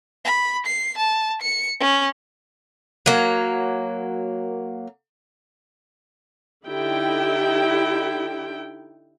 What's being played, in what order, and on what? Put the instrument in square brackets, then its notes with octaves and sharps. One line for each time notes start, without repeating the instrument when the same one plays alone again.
[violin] B5
C7
A5
C#7
C#4
[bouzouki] F#3 A#3
[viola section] D3 D#4 E4 G4 G5